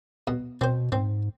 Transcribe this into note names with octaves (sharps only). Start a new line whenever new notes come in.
B2
B2 C4 C5
G#2 C4